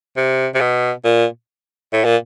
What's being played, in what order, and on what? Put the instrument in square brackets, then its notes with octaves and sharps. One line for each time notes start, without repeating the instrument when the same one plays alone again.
[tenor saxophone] C3
C3
B2
A#2
A2
A#2